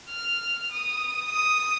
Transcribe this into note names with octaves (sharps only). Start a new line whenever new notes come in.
F6
D#6
D#6